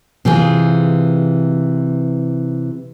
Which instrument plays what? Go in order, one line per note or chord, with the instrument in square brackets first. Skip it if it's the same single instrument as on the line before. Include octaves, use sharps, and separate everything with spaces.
[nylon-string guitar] C3 E3 F4 G#4